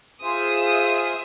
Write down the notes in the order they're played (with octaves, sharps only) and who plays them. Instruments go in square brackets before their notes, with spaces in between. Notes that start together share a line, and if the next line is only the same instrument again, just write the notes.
[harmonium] F4 G#4 C5 [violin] E5 D#6